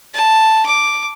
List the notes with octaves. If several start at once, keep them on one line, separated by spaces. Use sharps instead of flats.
A5
D6